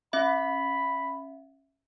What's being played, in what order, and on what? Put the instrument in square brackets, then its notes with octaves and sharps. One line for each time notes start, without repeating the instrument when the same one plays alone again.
[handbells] C#4 E5 [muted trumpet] B5